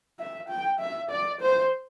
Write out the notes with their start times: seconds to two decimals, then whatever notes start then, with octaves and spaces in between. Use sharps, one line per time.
0.19 E5
0.49 G5
0.80 E5
1.10 D5
1.41 C5